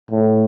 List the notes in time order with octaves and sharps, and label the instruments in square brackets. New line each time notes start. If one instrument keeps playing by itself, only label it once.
[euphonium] A2